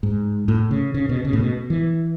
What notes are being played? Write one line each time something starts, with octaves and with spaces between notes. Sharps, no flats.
G#2
A2
C#3
C#3
B2
C#3
A2
B2
E3